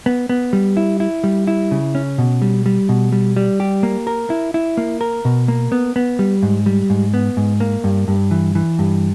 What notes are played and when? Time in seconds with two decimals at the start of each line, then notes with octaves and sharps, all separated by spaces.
0.06 B3
0.29 B3
0.53 G3
0.77 E4
1.00 E4
1.24 G3
1.47 E4
1.71 C#3
1.95 C#4
2.18 B2
2.42 G3
2.66 G3
2.89 B2
3.12 G3
3.36 G3
3.60 G4
3.83 A#3
4.07 A#4
4.30 E4
4.54 E4
4.77 A#3
5.01 A#4
5.25 B2
5.48 A#3
5.72 B3
5.96 B3
6.19 G3
6.43 G#2
6.66 G3
6.90 G#2
7.14 B3
7.37 G#2
7.60 A#3
7.84 G2
8.08 G2
8.31 E3
8.55 E3
8.79 G2